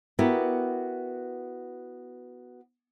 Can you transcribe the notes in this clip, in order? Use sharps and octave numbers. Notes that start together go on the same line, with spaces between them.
B3 E4 F#4 G4 A#4 B4